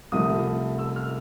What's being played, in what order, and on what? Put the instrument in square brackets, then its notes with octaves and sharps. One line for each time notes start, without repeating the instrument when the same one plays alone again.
[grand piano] C2 C3 F3 A3 D#6
E6
F6